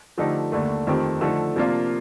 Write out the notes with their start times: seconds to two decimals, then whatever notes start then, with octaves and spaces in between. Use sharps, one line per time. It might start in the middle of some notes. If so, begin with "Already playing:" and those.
0.18 D3 F3 A3 D#4 G4
0.52 D#2 D3 A3
0.87 F2 D#3 A3 C4 G4
1.21 D3 F3 A3 D#4 A4
1.56 C3 F3 A#3 D4 F4